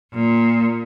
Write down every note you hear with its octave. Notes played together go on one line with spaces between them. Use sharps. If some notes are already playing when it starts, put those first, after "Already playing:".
A#2